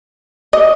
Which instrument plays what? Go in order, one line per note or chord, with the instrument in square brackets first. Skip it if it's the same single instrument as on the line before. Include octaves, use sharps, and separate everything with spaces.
[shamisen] D#5